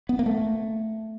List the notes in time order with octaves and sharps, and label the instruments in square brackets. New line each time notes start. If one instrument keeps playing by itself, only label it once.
[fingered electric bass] B3
A#3
A3